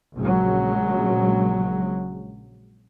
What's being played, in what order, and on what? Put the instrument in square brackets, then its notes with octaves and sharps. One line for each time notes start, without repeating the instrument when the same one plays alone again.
[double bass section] A#1 C#3 F#3 G#3